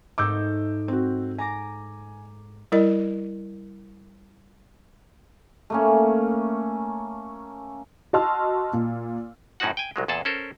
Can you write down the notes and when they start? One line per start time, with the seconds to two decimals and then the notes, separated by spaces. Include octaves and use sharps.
0.18 G#2 A3 D#4 D6 E6 G6
0.88 C4 F#4
1.38 G#5 A#5 D6 A#6
2.72 G3 E4 A#4 D#5
5.70 A3 A#3 C#4
8.13 F#4 D#5 A5 C6 E6 F6
8.73 A#2
9.60 F#2 A2 C#4 D#4 F#4 F#5
9.77 G5 G#5
9.96 C2 F#3 G#3
10.08 E2 A#2 G#4 A4 A5
10.25 C#4 A4 A#4 C5